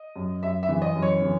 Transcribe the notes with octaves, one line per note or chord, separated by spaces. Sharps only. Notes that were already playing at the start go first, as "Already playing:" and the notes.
Already playing: D#5
F#2
F#2 E5
E5
E3
D#5
F#2
C#5
E3